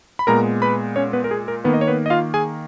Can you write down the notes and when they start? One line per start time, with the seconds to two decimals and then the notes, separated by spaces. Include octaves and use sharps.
0.19 B5
0.27 A#2 G#3 B3 A#4 A#5
0.62 B4 B5
0.96 C#4 C#5
1.13 B3 B4
1.24 A#4
1.31 G#4
1.48 A#4
1.64 D#3 A#3 B3 B4
1.74 D#5
1.81 C#5
1.87 B3 B4
2.06 D#5
2.10 F4 F5
2.34 G#4 G#5